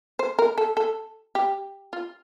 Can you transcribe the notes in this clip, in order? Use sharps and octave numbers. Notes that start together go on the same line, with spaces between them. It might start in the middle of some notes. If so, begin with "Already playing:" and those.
C5
A#4
A4
A4
G4
F4